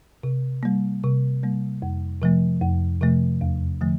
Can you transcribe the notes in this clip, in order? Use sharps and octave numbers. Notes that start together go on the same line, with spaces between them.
C3
G3 A#3
C3
G3 A#3
F2
C3 F3 A3
F2
C3 F3 A3
E2
D3 F3 A3